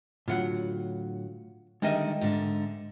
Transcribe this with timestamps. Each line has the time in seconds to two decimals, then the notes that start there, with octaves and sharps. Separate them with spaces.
0.28 A2 D3 F#3 F4 F#5
1.82 D3 D#3 G3 G#3 D#5 E5
2.21 G#2 D3